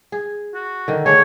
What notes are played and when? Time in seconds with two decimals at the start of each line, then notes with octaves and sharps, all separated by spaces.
0.12 G#4
0.54 F#4
0.88 D3 D#3
1.06 A3 D4 G#4 C#5